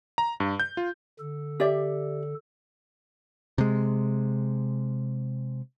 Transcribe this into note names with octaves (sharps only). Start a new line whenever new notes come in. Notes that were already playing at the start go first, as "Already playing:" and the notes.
A#5
G2
G6
F4
D3 A4
G4 D5 E5
C3 G#3